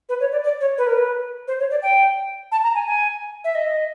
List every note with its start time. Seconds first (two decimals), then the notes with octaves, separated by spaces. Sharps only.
0.09 B4
0.20 C#5
0.32 D5
0.44 D5
0.61 C#5
0.78 B4
0.87 A#4
0.95 B4
1.48 C5
1.60 C#5
1.71 D5
1.82 G5
2.52 A5
2.63 A#5
2.75 G#5
2.87 G#5
3.44 E5
3.55 D#5